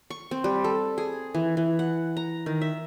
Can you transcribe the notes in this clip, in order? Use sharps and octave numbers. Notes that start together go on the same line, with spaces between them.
C#6
C4
G3
A4
G#4
E3
E3
F#5
A#5
D#3
E5